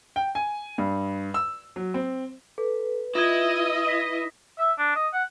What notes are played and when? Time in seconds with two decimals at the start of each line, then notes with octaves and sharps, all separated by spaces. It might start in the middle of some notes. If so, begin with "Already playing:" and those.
0.16 G5
0.35 G#5
0.78 G2
1.34 E6
1.76 F#3
1.94 C4
2.58 A4 B4
3.15 E4 F4 D#5 G#6
3.88 A#6 B6
4.58 E5
4.79 D4
4.96 D#5
5.14 F#5